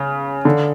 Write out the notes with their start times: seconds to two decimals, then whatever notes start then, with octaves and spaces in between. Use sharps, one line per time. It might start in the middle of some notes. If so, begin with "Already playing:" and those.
Already playing: C#3
0.45 D3